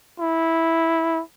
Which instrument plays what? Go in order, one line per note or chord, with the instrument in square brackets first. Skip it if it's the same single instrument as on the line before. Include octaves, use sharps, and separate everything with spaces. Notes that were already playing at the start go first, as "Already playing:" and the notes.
[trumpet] E4